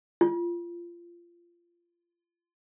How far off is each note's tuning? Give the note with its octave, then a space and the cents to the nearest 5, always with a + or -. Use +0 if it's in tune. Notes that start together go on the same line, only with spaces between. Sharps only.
F4 -20